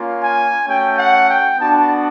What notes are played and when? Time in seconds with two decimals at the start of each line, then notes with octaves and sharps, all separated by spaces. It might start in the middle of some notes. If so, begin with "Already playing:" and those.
Already playing: A#3 C#4 F4
0.21 G#5
0.66 A3 C#4 F#4 G5
0.97 F#5
1.28 G5
1.58 B3 D4 F#4 A5